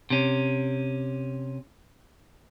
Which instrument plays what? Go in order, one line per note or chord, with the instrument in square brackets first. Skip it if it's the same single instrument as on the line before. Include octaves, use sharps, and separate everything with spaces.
[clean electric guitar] C3 C#4